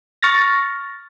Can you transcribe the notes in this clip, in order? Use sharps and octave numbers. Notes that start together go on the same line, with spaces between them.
C#6 F6 A6 A#6